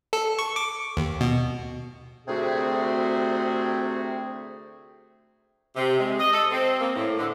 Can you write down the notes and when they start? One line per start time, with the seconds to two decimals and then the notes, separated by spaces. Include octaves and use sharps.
0.13 A4
0.39 C#6
0.56 D6
0.97 D#2
1.21 B2
2.28 D2 C3 A3 C4 F#4 G#4
5.76 C3
5.98 G#3
6.18 D#5
6.33 A4
6.51 C4
6.80 A#3
6.95 A2
7.18 D3